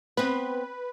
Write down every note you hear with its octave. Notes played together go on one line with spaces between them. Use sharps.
B3 C4 B4